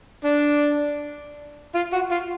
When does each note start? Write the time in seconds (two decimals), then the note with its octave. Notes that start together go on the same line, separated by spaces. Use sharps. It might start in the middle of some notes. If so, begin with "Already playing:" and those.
0.25 D4
1.75 F4
1.93 F#4
2.11 F4